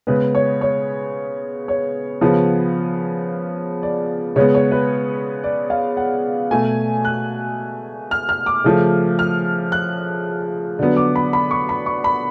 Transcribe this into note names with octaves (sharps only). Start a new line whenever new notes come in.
C#3 G#3 B3 B4
C#5
C#5
C#5
C#3 F3 B3
D5
C#3 G#3 B3 C#5
C#5
B4
D5
F5
F#5
B2 A3 G#5
F#6
F6
F6
D6
C#3 F3 A3
F6
F#6
D3 F#3 B3
D6
B5
B5
C#6
B5
C#6
B5